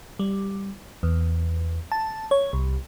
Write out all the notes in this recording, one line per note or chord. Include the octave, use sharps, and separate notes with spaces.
G3
E2
A5
C#5
C2